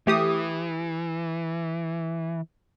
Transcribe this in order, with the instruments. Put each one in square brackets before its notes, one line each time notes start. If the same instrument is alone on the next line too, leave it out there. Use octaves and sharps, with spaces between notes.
[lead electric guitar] E3 [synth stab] A3 G4 D#6